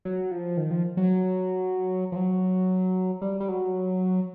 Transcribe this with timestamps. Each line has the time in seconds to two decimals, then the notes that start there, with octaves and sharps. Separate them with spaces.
0.05 F#3
0.31 F3
0.57 D#3
0.71 F3
0.97 F#3
2.12 F3
2.16 F#3
3.22 G3
3.40 G3
3.49 F#3